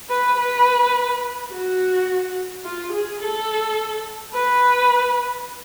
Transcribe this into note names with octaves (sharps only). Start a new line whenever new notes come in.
B4
B4
F#4
F4
G#4
A4
B4